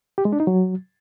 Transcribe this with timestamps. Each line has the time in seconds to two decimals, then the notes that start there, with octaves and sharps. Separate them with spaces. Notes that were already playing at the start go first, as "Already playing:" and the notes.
0.18 G4
0.25 G#3
0.33 D4
0.40 D#4
0.47 F#3